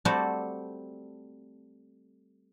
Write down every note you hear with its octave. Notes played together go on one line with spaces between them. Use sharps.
G3 A3 C4 F#4 A4 D5